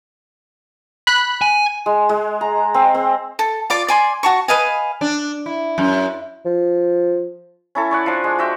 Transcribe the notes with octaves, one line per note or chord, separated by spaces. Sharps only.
B5 F#6
G#5
G#3
G#3
A#5
C4
C4
A4
F4 D5 D6
D5 G#5 C6
F#4 A5 C#6
B4 D#5 F5 G#5
D4
E4
F#2
F3
C#4 E4 A4
C#5 D5 F#5
F3 D4
G#3
F#4 E5 G5